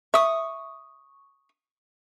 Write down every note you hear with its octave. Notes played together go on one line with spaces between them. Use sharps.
E5 C#6 D#6